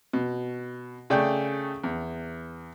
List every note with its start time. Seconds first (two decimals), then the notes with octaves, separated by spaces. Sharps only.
0.13 B2
1.10 C#3 A3 D5 G5
1.84 E2